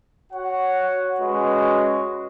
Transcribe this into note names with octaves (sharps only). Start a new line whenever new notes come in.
F#4 C#5 F#5
G#3 C#4 F#4 B4 D#5